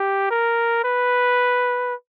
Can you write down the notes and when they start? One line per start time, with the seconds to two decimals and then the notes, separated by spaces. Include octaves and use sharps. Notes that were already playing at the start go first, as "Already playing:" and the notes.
Already playing: G4
0.31 A#4
0.84 B4